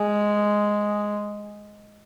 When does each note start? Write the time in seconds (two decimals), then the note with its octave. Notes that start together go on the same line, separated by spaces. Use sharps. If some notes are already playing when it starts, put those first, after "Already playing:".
Already playing: G#3